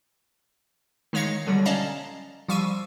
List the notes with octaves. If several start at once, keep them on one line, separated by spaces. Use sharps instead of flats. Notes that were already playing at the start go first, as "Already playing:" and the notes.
D#3 G#3 C#5 F5 A#6 C#7
B2 D3 F#3 G3
C#4 D5 D#5 F5 A5 A#5
F3 G3 F5 C#6 E6 D#7